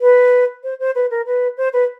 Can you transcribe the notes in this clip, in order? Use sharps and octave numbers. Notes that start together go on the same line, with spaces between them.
B4
C5
C5
B4
A#4
B4
C5
B4